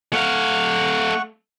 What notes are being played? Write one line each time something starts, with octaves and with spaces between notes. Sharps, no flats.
A3 F5 F#5 C#6